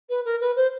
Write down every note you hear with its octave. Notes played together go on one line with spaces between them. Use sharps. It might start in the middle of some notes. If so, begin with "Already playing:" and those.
B4
A#4
B4
C5